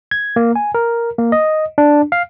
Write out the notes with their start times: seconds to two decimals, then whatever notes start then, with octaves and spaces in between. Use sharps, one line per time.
0.11 G#6
0.36 A#3
0.56 G#5
0.75 A#4
1.18 A#3
1.32 D#5
1.78 D4
2.12 F5